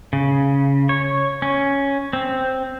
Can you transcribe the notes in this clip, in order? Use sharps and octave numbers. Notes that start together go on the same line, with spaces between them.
C#3
C#5
C#4
C4